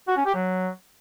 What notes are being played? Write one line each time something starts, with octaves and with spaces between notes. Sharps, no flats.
F#4
C#4
G4
F#3